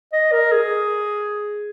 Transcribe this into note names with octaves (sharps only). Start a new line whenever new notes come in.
D#5
A#4
G#4